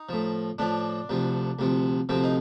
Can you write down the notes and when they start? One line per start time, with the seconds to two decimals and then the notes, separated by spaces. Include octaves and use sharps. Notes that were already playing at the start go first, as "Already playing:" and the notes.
Already playing: D#4
0.09 A2 F3
0.58 A2 F3 D4
1.09 D2 C3 F3
1.59 D2 C3 F3
2.09 D2 C3 F3 C4
2.24 D#4